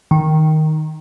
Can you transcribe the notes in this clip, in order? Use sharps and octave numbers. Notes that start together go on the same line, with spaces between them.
D#3